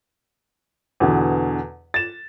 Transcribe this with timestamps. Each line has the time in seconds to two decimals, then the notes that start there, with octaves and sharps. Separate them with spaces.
1.00 E2 B2 D3
1.94 A6 E7